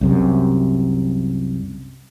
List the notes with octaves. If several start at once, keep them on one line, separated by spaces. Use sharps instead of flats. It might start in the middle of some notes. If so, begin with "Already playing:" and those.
C2 F#2 C3